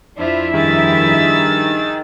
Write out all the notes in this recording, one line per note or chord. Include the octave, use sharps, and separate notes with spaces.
F2 D4 E4 F4 C5 E5
G2 D#3 G#4 E6 A6